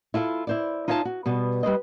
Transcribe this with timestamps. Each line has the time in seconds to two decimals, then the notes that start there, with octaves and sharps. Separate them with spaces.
0.14 E4 F4 A4 D#5 E5
0.47 E4 C5 D5
0.88 D#4 F4 C#5 E5 F#5 A5
1.05 F#4
1.26 B2 G3 B3
1.63 G3 B4 C5 D#5